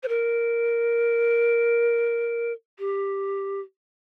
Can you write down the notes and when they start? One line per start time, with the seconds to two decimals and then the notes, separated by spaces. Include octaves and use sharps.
0.03 C5
0.08 A#4
2.79 G4